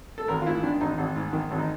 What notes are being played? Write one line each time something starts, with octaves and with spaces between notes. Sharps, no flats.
A4
G#1 A#4
F4
G#2 E4
D#3 D4
G#1 D#4
G#1
G#2
D#3
G#1
D#4